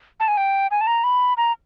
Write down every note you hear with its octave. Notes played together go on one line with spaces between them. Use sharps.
A5
G#5
G5
G#5
A5
A#5
B5
A#5